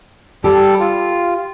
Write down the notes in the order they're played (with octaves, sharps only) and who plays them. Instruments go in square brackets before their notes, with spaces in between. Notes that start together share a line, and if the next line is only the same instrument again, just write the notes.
[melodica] G3 A4 [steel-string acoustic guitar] G4
[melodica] F4